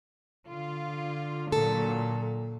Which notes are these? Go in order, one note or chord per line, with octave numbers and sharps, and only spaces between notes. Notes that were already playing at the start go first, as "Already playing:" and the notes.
D3 F4
A#2 F#3 A4